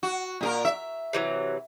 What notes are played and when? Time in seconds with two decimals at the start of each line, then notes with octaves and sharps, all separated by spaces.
0.03 F#4
0.41 A#2 G#4 A#4
0.65 E5
1.13 C3 E3 F#3